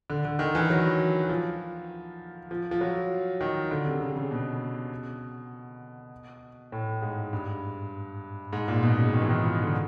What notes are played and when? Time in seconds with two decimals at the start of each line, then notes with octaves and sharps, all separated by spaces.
0.10 D3
0.25 D3
0.39 D#3
0.55 E3
0.70 F#3
1.24 F#3
1.29 F3
2.51 F3
2.71 F3
2.81 F#3
3.41 D#3
3.71 D3
3.85 C3
4.01 C#3
4.16 C#3
4.31 B2
6.72 A2
7.02 G#2
7.33 G2
8.53 G#2
8.68 A#2
8.83 B2
8.98 C#3
9.13 D#3
9.22 E3
9.29 D#3
9.43 F3
9.62 D3